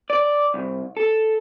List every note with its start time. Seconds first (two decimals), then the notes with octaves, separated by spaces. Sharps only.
0.10 D5
0.54 C2
0.97 A4